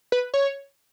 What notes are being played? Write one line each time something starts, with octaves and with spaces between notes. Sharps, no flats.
B4
C#5